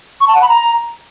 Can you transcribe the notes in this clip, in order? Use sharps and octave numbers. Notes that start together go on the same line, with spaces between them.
C#6
A5
F#5
B5
A#5